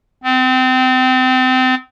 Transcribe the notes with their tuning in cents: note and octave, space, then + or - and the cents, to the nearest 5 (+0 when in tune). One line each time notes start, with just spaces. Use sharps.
C4 -30